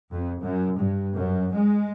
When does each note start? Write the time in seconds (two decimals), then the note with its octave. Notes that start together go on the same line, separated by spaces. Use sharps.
0.10 F2
0.41 F#2
0.77 G2
1.15 F#2
1.52 G#3